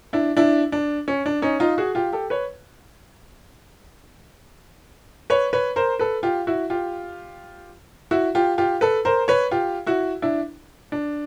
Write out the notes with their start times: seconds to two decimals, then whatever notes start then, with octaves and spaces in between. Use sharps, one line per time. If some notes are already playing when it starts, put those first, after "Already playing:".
0.13 D4 E4
0.37 D4 E4
0.72 D4
1.08 C#4
1.26 D4
1.42 C#4 D#4
1.60 D#4 F4
1.78 F#4 G#4
1.95 F4 G4
2.13 G4 A4
2.30 B4 C#5
5.30 B4 C#5
5.53 B4 C#5
5.76 A#4 C5
5.99 A4 B4
6.23 F4 G4
6.47 E4 F#4
6.70 F4 G4
8.11 E4 F#4
8.35 F4 G4
8.58 F4 G4
8.81 A4 B4
9.05 A#4 C5
9.28 B4 C#5
9.51 F4 G4
9.87 E4 F#4
10.22 D4 E4
10.92 D4